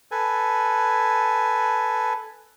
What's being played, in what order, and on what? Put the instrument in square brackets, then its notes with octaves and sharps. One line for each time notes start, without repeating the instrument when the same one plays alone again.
[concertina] A4 B4 G#5